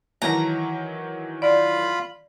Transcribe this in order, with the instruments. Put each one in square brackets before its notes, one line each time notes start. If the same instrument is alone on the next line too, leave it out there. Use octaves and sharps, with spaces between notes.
[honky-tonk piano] D#3 E3 F#3 [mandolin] A#5
[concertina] F4 B5 [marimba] D5